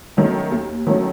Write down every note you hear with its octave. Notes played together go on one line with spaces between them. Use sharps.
D#3 F#3 A3 C#4
D#2
D#3 F#3 A3 C#4